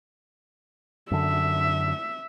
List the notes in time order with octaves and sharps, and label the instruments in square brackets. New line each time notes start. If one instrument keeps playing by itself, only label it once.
[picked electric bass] F#2 D3 [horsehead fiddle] E5